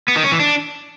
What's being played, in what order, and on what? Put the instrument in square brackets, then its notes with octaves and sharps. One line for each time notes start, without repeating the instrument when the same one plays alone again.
[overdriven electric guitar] B3
D#3
C#4
E3
D4